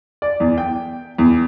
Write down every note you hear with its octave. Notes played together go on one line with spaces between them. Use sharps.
D5
E2
G5
E2